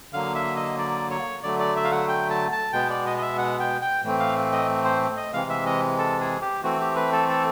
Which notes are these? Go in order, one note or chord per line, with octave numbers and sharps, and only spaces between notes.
D3 F#3 A#3 F5
E5
D#5
D5
C#5
D3 F#3 A3 D5
D5
E5
F5
F#5
G5
A5
A5
B2 G#3 B3 G5
D5
D#5
D#5
E5
F#5
G5
G5
A2 E3 A3 C4
F5
D#5
C5
D#5
C3 E3 G#3 F5
E5
D#5
A4
G#4
G4
E3 A3 C4 F#4
G4
B4
A4
A4